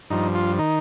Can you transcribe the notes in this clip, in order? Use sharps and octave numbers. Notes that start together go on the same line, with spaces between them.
G2 F3 D#4
F4
D#3 D#4